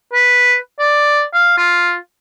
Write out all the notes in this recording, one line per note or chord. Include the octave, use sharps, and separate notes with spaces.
B4
D5
F5
F4